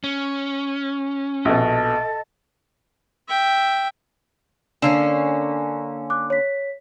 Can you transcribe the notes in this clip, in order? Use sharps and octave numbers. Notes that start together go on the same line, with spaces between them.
C#4
A#1 B2 A4 D#5
E5 G5
D3 A#3 C#4 D4 E6 E7
D6 F#6
C#5 B6